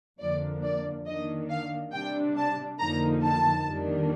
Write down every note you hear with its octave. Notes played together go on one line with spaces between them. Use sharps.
F2 D3 F3 A#3 D4 D5
D5
D#3 A#3 D4 D#5
F5
C3 G3 D4 G5
A5
F2 D3 F3 A#3 D#4 A#5
A5
F2 D#3 G3 A#3 D4